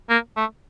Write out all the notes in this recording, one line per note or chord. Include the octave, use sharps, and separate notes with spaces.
A#3
A3